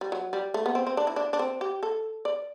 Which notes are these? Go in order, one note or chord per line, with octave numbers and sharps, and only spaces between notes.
G3
F#3
G3
A3
B3
C4
C4
D4
E4
D4
D4
C4
G4
A4
D5